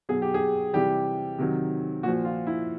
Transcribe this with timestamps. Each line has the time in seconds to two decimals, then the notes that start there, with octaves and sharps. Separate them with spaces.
0.09 B2 F#3 G#4
0.22 G4
0.34 G#4
0.73 C3 E3 G3 G4
1.39 C3 D#3 F#3
2.03 A#2 F3 F#4
2.25 F4
2.47 E4